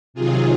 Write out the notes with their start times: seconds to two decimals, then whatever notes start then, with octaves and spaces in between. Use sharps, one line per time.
0.14 C3 D#3 F#3 F4 G#4